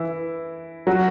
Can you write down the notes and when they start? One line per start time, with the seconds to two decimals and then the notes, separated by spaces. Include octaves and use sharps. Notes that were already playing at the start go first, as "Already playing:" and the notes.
Already playing: E3 E4
0.87 F#3 F#4